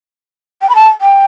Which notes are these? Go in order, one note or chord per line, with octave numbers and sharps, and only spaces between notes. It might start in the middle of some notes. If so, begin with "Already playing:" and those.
G5
B5
A5
G5